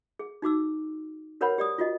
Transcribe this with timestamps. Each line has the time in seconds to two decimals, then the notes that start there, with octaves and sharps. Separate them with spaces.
0.19 G#4
0.42 D#4 F#4 D6 E6
1.41 F#4 A#4 B4 C#5 F#5 B5
1.58 G4 D5 D#6
1.78 F4 F#4 D#5